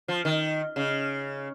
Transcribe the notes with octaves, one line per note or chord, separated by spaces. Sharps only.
F3
D#3
C#3